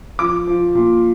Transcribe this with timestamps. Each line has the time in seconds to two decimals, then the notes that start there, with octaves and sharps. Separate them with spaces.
0.19 F3 D6
0.47 F3
0.75 A#2